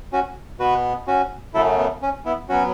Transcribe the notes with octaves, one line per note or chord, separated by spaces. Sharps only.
C#4 F#4
B2 B3 F#4 B4
C#4 F#4
F#2 C#3 F#3 A3 E4 A4
B3
C#4
B3 E4
F#3 B3 C#4 F#4